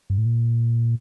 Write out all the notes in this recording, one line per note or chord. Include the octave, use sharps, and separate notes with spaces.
G2
A2
A#2